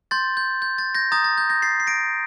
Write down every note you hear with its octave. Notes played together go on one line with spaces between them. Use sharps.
C6 G6 A6
G6
G6
A6
G6 A#6
A#5 D#6 G6 A6
A6
G6
G6 A#6
A6 C7
C7
A#6 D7